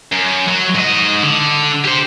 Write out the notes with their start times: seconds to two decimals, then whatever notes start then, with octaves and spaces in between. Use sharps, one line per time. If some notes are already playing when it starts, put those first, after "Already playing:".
0.12 F#2
0.48 F#3
0.75 G#2 D#5
1.23 D3
1.84 G4 C5